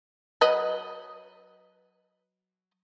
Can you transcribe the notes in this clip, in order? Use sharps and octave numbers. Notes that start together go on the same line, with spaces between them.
F#3 B4 D#5